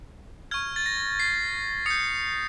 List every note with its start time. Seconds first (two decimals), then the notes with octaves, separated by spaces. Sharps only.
0.51 C#6 F6 G#6
0.76 A6
0.86 A#6
1.20 C7
1.86 D#6 G6 C#7